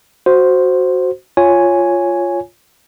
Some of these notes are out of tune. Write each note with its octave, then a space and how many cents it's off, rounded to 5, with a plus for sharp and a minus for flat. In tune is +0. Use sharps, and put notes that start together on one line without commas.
F#4 +0 C5 +0
F4 +0 C#5 +0 G#5 +0